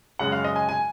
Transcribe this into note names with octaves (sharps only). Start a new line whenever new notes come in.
F#2 C#3 G#3 F#5
F5
D#5
G#5
G#5